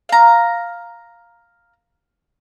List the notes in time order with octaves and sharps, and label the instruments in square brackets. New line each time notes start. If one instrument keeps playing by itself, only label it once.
[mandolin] F5 A#5